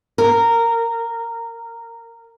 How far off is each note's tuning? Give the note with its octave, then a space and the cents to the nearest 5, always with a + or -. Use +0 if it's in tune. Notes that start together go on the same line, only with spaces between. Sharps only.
A#4 -15